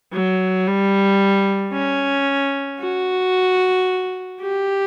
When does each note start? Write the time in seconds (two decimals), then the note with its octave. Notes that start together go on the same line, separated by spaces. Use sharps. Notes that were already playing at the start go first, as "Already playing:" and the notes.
0.13 F#3
0.67 G3
1.73 C#4
2.80 F#4
4.41 G4